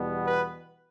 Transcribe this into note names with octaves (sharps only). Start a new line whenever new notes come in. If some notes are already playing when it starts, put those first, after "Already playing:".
Already playing: E2 B2 G3 B3
B4